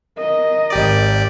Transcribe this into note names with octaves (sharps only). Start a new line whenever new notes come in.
A#4 D#5
G#1 G4 D5